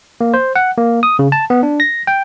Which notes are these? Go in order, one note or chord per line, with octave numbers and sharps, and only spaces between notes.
A#3
C5
F#5
A#3
D#6
C#3
A5
B3
D4
A#6
G5